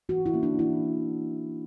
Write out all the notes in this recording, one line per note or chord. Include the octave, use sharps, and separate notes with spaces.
E3 F#4
E4
A#3 C#4
D4
E3 E4